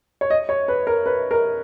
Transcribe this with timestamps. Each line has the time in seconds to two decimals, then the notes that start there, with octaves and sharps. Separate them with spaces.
0.21 C#5
0.30 D#5
0.49 C#5
0.68 B4
0.87 A#4
1.06 B4
1.31 A#4